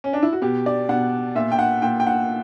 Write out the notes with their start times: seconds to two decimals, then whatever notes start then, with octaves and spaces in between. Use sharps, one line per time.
0.04 C#4
0.13 D4
0.23 E4
0.33 F#4
0.42 B2 G4
0.66 D5
0.89 B2 F#5
1.35 A#2 E5
1.52 G5
1.59 F#5
1.82 A#2 G5
2.00 G5
2.07 F#5